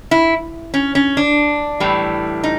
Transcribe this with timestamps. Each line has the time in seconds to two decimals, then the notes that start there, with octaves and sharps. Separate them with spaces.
0.11 E4
0.74 C#4
0.95 C#4
1.17 D4
1.80 A2 E3 G3
2.44 D#4